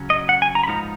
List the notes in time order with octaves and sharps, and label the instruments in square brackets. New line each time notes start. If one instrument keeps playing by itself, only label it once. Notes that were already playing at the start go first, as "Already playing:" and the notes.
Already playing: [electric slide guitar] C#3 F#3 C#4
[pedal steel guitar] D#5
F#5
G#5
A#5
B5
[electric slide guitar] G#2 F3 B3 D#4 [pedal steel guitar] A#5